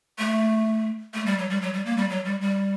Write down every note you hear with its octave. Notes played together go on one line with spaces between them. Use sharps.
A3
A3
G3
F#3
G3
F#3
G3
A#3
G3
F#3
G3
G3